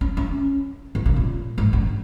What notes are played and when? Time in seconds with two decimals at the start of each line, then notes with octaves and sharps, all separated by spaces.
0.01 C#4
0.17 C#4
0.95 D#3
1.06 C#3
1.16 A#2
1.58 G#2
1.73 G2